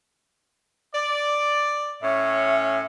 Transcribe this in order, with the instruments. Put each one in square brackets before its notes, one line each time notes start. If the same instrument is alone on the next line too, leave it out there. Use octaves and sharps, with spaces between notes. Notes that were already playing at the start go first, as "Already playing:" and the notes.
[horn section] D5
[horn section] A2 C#4 [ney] E5